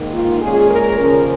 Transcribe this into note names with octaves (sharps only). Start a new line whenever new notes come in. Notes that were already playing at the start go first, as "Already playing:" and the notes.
Already playing: G#2 D#3 A#3 D#4
F4
A#2 G#3 C#4 G#4
A#4
D#2 C#3 F3 C#4 A#4